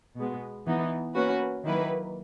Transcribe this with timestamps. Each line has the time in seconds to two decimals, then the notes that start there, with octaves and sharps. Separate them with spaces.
0.16 B2 G#3 B3
0.66 E3 B3 D#4
1.15 A#3 C#4 F#4 B4
1.64 D#3 F#3 A#3 E4 B4